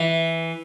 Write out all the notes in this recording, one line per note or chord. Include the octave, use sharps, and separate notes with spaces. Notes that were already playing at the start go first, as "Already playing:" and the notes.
Already playing: E3